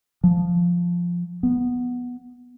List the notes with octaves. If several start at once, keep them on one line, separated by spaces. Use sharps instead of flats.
F3
B3